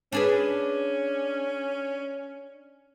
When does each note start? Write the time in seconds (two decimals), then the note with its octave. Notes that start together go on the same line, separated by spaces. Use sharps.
0.12 C#4 D4 G#4 B4